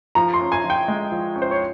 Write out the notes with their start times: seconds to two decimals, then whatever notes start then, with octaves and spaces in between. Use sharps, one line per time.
0.15 F3 A#5
0.34 C6
0.41 C#4
0.52 G#5
0.64 F3
0.70 G5
0.88 G#3
1.12 F3
1.36 C#4
1.42 C5
1.51 C#5